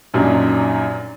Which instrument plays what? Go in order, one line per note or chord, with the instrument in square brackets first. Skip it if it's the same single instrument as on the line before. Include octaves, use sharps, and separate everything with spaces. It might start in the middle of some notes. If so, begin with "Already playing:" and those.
[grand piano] F#2 A#2 F#3 G3 D4 D#4